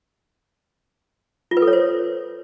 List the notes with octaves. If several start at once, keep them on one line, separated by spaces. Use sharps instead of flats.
F4
B4
A4
C#5
C5